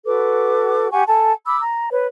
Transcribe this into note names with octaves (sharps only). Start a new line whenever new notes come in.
F#4 A4 B4 D6
G4 F#5 G#5 C#6
A4 G#5 A5
B5 D6 E6
A#5
B4 C#5